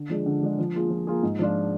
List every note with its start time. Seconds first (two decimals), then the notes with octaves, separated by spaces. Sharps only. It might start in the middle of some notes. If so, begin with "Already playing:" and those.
Already playing: D3
0.10 F3 G#3 D4 G#4
0.26 D3
0.42 F3 G#3 D4 G#4
0.58 F3
0.74 A#3 F4 G#4
0.90 F3
1.07 A#3 F4 G#4
1.23 G#2
1.39 F3 G#3 D4 F4